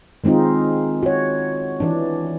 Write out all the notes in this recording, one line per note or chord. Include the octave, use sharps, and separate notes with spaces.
D#3 G#3 C4 D#4 F4
F#4 C#5
E3 D4